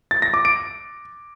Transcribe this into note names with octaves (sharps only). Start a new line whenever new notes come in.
A6
A#6
D6
D7